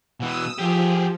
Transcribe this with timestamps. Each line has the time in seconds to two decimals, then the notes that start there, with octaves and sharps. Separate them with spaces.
0.20 B2 E3 D#6 E6
0.58 F3 G4 G#4